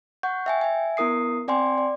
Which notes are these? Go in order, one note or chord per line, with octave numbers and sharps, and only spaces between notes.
F#5 C#6 G6
E5 G5 G#5
E5 G#5
B3 E4 A#4 D#6 C7
C4 D5 G5 G#5 C6
D5